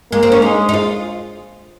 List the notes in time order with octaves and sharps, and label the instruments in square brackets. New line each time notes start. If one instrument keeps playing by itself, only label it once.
[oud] G#3 [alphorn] A#3
[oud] C4
C#4
[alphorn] G#3 [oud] D#4
[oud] D#4
F4